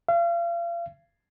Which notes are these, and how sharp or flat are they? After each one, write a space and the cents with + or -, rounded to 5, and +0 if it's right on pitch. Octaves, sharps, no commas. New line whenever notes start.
F5 -35